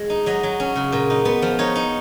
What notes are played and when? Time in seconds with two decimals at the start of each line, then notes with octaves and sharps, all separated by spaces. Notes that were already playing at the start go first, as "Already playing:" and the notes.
Already playing: G#3
0.10 D#4
0.26 F#3 D#5
0.43 F#3
0.60 C#4
0.76 C#3
0.92 A#2
1.10 D#4
1.25 B3
1.42 F3
1.59 D#4 C#5
1.75 D#4